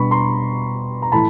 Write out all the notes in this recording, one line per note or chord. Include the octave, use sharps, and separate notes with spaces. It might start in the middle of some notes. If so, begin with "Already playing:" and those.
Already playing: B2 G3 B3 D4 B5 C#6
A#5 C6
A#5
A2 E3 A5 B5